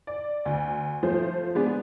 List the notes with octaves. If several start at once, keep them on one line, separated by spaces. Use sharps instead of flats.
D5
D2
F3 A3 C5
G#3 B3 D4